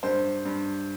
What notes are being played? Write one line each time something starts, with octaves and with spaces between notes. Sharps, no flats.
G2 C5
G2